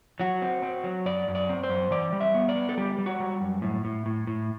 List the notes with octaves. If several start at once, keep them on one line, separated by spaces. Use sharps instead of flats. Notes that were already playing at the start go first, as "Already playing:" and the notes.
F#3 F#4
C4
C4
F#3
F#2 D5
F#2
D5
C4
C5
F#2
E3 D5
G3
E5
B3
D5
B3
A4
G3 G4
G3
F#4
G3
F#2
A2
A2
A2
A2